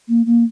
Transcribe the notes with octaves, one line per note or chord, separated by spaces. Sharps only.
A#3
A#3